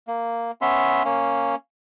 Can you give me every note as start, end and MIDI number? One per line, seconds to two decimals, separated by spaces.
0.08 0.51 58
0.62 1.03 59
0.62 1.03 61
0.62 1.03 76
0.62 1.03 84
1.05 1.55 58
1.05 1.55 61